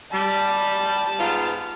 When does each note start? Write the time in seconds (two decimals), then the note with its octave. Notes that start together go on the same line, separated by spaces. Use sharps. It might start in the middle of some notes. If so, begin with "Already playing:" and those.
0.13 G3 A5
1.19 G#2 B3 F4